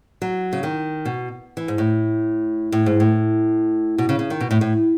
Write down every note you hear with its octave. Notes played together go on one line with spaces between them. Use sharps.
F#3
C#3
D#3
B2
E3
G#2
A2
A2
G#2
A2
B2
C#3
C#3
D#3
B2
A2
A2